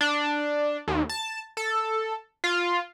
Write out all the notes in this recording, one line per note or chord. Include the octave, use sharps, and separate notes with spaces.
D4
D#2
A5
A4
F4